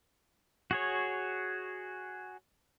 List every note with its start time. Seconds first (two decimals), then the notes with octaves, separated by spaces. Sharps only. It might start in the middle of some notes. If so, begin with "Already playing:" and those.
0.71 F#4 G#4 C#5